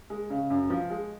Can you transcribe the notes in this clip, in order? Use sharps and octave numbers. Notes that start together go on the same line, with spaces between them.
G#3
C#3
F#2
F3
G#3